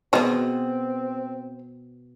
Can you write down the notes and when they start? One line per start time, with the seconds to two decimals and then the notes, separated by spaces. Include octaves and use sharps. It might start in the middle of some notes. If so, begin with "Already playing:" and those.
0.13 B2 G#3 B3 C4 F#4 D#5